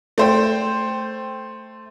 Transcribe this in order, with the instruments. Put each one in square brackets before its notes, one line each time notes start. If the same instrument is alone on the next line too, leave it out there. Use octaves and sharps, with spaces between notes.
[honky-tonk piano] A3 C5 G5